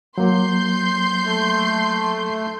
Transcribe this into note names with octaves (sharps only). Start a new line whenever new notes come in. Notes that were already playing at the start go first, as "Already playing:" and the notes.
F#3 A#3 C6 G6
A3